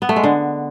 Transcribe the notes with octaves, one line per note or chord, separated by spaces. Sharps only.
B3
A3
G#3
D3